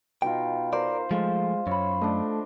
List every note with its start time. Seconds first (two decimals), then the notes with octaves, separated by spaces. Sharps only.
0.22 B2 D#4 F4 G5
0.73 A#4 C5 D5
1.11 F3 G#3 A3 F4 C5
1.67 F#2 C5 C#5 B5
2.01 A3 D4 D#5